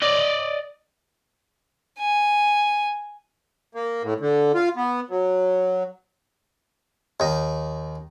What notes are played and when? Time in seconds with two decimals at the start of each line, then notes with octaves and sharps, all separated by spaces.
0.02 D5 D#5
2.00 G#5
3.75 A#3
4.03 A2
4.20 D3
4.55 F4
4.76 B3
5.10 F#3
7.20 D#2 D#4